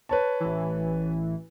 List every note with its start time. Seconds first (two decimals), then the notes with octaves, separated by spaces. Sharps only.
0.09 B4 C#5 A5
0.40 A1 E3